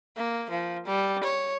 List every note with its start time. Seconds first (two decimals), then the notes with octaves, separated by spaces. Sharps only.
0.17 A#3
0.51 F3
0.86 G3
1.24 C#5